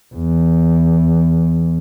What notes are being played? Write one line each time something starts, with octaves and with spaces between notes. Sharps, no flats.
E2